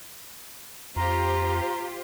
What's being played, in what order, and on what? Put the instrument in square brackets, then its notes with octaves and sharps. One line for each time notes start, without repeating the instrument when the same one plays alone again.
[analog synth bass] F2 [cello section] F4 G4 C5 [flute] A#5